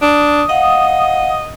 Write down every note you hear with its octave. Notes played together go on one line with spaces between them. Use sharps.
D4 D#6
D#5 F5 F#5